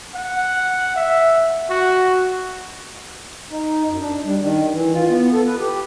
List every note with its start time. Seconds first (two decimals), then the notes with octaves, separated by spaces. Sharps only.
0.15 F#5
0.96 E5
1.70 F#4
3.50 D#4
3.87 F#2
4.00 D4
4.24 G3
4.39 D#3
4.72 E3
4.93 F4
5.09 B3
5.32 A4
5.46 B4
5.59 G4